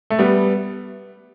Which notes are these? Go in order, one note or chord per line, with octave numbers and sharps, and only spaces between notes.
A3
G3 B3